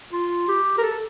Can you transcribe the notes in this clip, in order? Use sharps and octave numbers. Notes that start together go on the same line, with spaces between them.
F4
G4
A#4
A4